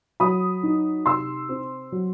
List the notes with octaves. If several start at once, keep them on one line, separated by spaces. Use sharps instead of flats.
F#3 B5 D#6
D#4
C3 C6 E6
C4
F#3